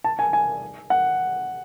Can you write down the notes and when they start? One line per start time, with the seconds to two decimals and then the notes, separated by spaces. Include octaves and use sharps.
0.04 A5
0.19 G#5
0.33 G#5
0.90 F#5